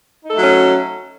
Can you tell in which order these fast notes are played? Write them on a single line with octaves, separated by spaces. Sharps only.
D#4 A4 A3 F#3 C#4